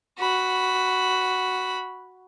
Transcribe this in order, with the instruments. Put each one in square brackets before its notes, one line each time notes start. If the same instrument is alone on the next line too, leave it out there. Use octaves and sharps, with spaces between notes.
[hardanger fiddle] F#4 B5